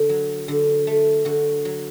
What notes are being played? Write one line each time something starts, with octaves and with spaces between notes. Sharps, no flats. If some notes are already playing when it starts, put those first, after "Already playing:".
Already playing: D3 A4
F#3
D3
A3
D3 F#4
F#3